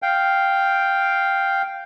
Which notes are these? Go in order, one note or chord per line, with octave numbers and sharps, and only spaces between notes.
F5 G5